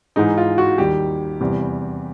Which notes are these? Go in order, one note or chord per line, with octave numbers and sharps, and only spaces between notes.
G#2 E3 G#3 D#4
F4
F#4
D#2 D#3 G3 G4
E2 C3 E3 G3